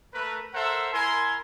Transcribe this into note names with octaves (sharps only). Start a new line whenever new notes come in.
A3 A#4 B4
A4 A#4 C5 E5 F#5
E4 A#4 G#5 C6